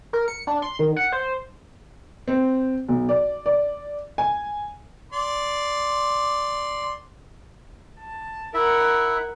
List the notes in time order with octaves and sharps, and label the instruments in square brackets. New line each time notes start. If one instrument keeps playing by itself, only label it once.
[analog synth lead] A#4
C#7
D4
C6
D#3
F#5
C5
[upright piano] C4
B1
D5
D5
G#5
[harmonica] D5 C6
[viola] A5
[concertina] E4 E5 [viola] A#4 F#5